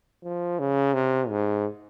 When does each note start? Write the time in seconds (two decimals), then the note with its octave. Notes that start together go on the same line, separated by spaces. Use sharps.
0.24 F3
0.59 C#3
0.94 C3
1.29 G#2